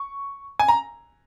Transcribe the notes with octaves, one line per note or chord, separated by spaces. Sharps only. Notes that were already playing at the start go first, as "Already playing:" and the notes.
Already playing: C#6
G#5
A#5